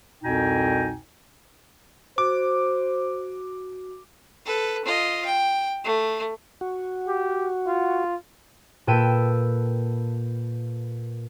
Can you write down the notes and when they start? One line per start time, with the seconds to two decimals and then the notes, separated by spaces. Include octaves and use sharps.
0.22 C2 F2 B2 D#4 G5 G#5
2.18 F#4 C5 D6
4.46 A4 B4
4.85 F4 D#5
5.25 G5
5.84 A3
6.61 F#4
7.08 G4
7.67 F4
8.87 A#2 A4 B4 G5 E6 D#7